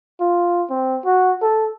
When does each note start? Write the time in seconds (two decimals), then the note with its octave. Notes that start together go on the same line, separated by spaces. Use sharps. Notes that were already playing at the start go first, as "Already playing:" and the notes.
0.21 F4
0.70 C4
1.06 F#4
1.42 A4